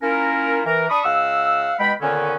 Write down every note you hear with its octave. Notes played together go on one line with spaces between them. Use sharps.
A#3 C#4 E4 F4 A#4
E3 A#4
D4 B5 C#6 D#6
C#2 F5 F#5 E6
B2 G#3 G5 B5
A#2 D3 D#3 B3 C#4